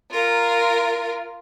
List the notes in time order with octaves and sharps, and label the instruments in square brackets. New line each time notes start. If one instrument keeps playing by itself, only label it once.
[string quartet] F4 A#4